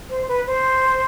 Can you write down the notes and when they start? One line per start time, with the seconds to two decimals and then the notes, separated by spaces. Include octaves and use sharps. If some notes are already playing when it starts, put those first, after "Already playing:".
0.10 C5
0.28 B4
0.47 C5